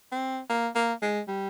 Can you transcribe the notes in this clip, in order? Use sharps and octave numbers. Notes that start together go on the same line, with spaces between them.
C4
A#3
A#3
G#3
G3